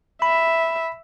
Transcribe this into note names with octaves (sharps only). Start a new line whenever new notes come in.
E5 B5